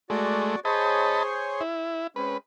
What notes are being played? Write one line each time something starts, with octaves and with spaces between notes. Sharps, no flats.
G#3 A3 F#4 D5
G#4 C5 C#5 D#5 A5 B5
E4
G#3 C4 C#4 B4